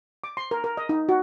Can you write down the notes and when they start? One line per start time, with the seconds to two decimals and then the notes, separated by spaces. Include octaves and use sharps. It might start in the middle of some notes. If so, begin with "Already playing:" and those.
0.24 D6
0.37 C6
0.51 A#4
0.64 A#4
0.77 D#5
0.89 D#4
1.09 F#4